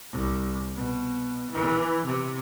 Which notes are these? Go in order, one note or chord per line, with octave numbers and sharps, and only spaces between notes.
C2
B2
E3
C3